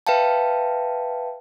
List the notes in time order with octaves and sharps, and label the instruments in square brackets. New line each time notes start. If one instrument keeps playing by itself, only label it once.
[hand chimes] B4 E5 F5 G5 A5